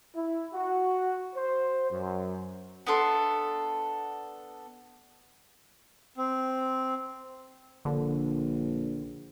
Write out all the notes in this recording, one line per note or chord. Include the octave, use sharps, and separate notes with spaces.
E4
F#4
C5
F#2
B3 D4 A4 C6
C4
A#1 D3